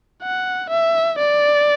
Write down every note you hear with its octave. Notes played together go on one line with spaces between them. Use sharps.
F#5
E5
D5